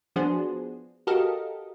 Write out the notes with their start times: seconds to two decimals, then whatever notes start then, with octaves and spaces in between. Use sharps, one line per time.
0.16 F3 B3 D4 F#4 G#4 C5
1.07 F#4 G4 A4 A#4 D#5 F5